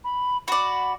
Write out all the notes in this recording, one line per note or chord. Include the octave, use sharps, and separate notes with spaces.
B5
F#4 D5 B5